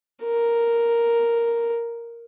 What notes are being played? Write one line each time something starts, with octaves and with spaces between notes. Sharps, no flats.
A#4